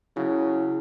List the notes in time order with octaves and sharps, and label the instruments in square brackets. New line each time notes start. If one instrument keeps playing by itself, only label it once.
[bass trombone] C#3 [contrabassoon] F#3 [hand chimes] E4